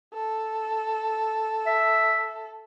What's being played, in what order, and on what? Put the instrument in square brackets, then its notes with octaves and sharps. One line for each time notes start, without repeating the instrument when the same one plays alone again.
[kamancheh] A4
[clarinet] E5